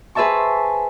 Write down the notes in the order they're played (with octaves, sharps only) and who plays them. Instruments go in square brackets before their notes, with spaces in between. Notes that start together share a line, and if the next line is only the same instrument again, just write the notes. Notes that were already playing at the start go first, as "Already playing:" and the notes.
[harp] G#4 B4 C5 E5 A5 C#6